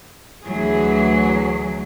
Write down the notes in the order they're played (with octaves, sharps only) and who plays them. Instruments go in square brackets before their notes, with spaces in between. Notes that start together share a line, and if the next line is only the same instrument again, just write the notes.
[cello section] D2 E3 G#4 [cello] F#3